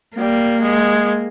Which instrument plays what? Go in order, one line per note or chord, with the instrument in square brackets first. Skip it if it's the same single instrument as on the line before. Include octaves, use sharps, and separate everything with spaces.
[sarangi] G3 [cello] A#3
[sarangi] G#3